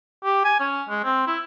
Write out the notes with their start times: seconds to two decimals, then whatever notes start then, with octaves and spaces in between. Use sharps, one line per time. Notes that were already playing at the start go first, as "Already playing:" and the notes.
0.24 G4
0.45 G#5
0.60 C#4
0.89 G#3
1.04 C4
1.27 E4